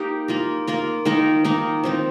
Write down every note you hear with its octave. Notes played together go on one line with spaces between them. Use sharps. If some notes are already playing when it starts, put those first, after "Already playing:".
Already playing: A#3 D#4 G4
A#3 F4 A#4
A#3 F4 A#4
D#3 A#3 D#4 A#4
D#3 A#3 D#4 A#4
F3 C4 D#4